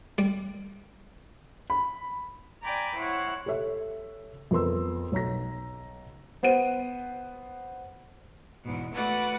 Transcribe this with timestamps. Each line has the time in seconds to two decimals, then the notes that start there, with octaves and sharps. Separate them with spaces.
0.18 G3
1.70 B5
2.64 D5 G5 G#5 A#5 B5 D6
2.96 E4 C5 C#5 F#5
3.46 G4 A4 C#5 E5
4.51 F2 B3 A#4 C6 E6
5.12 B1 C#5 A#5 A#6
6.43 B3 C5 F#5 D#7
8.63 E2 G#2 B2
8.93 A3 F#4 B4 D5 F#5 F#6